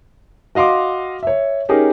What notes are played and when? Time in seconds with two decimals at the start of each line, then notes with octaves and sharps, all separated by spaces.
0.55 F#4 D#5 F5 C6 D6
1.23 C#5 E5
1.69 C#4 D#4 G4 G#4 A#4